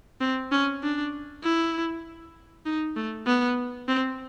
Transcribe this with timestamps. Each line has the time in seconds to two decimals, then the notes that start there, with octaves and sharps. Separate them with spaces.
0.21 C4
0.52 C#4
0.83 D4
1.44 E4
2.66 D#4
2.97 A3
3.27 B3
3.88 C4